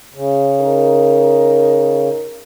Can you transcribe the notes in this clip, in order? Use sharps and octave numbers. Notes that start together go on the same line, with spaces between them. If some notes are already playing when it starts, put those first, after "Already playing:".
C#3
C#4 D#4 A#4